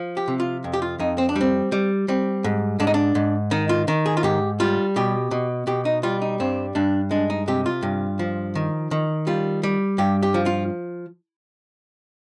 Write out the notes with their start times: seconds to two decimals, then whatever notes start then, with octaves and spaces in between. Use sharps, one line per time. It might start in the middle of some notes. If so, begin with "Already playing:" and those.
Already playing: F3
0.17 G4
0.28 C3
0.40 F4
0.64 F2
0.73 G4
0.82 F4
0.99 F2 D#4
1.18 C4
1.29 D4
1.36 G3
1.41 C4
1.72 G3
2.08 G3 C4
2.44 G#2
2.80 G#2 D4
2.87 D#4
2.94 D4
3.15 G#2
3.51 D#3 D#4
3.69 F4
3.88 D#3
4.06 G#4
4.17 F4
4.23 G#2 G4
4.60 G3 F4
4.96 B2 G4
5.31 B2
5.67 B2 G4
5.85 D#4
6.03 G3 F4
6.22 D#4
6.40 G2 C4
6.75 G2 D4
7.11 G#3 D4
7.30 D#4
7.48 C3 G4
7.66 F4
7.82 G2
8.19 F3
8.55 D#3
8.91 D#3
9.27 G3 F4
9.63 G3
9.98 G2 G4
10.23 G4
10.34 F3
10.46 F4